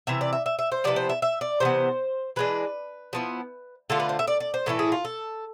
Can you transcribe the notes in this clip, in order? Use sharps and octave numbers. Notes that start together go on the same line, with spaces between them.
C3 E3 E5
D5
E5
E5
E5
C5
C3 F3 B3 E4 D5
C5
E5
E5
D5
C3 E3 B3 C5
E3 G#3 D4 B4
F3 B3 E4
D3 A3 D4 F4 A4
B4
C5
E5
D5
D5
C5
A2 E3 A3 E4 A4
G#4
F4
A4